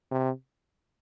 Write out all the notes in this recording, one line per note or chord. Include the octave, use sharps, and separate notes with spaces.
C3